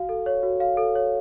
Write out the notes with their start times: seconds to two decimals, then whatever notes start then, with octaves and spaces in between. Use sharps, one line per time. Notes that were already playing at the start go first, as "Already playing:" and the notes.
Already playing: F#4 F5
0.09 A4
0.26 C#5
0.43 F#4
0.60 F5
0.77 A4
0.95 C#5